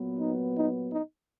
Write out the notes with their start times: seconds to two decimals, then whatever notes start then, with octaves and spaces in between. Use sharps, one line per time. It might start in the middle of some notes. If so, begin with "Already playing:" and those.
Already playing: A#2 F#3 B3
0.20 D#4
0.55 D#4
0.91 D#4